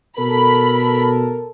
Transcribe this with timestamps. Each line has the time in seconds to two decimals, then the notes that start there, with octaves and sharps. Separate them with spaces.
0.19 B2 A4 A#4 B5